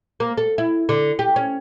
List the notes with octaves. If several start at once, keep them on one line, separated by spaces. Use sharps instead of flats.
A#3
A4
E4
D3
G4
C#4